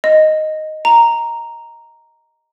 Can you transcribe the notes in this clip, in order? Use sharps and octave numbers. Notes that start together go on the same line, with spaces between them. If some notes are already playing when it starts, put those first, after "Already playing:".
D#5
A#5